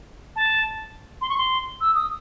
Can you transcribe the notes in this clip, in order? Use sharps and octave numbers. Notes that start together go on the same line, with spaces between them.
A5
C6
C#6
C6
E6
D#6